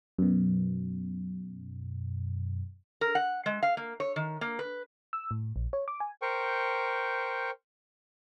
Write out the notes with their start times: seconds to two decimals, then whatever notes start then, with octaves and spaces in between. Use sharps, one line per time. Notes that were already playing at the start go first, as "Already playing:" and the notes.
0.19 F#2 B2
3.01 A#4
3.15 F#5
3.46 G#3
3.63 F5
3.77 A#3
4.00 C#5
4.16 D#3
4.41 A#3
4.59 B4
5.13 E6
5.31 A2
5.56 A#1
5.73 C#5
5.88 D6
6.00 G#5
6.22 A#4 C5 G5 C#6